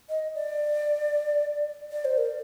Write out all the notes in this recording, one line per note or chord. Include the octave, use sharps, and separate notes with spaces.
D#5
D5
D5
C5
A#4